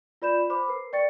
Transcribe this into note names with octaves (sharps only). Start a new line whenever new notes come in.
F4 B4 D5 B5 G6 E7
C5 B5 D6
A#4 B4 C7
D5 G5 C#6 A6 C#7